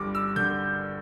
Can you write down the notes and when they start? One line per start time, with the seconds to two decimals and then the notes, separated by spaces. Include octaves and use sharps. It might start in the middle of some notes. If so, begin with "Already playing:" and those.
Already playing: G1 G3 D6
0.15 E6
0.36 D3 G6